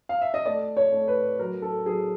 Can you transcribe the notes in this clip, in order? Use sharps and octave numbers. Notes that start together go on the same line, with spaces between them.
F5
E5
D#5
A3 D5
C#5
A3
B4
F#3 A#4
A4
F#3 G#4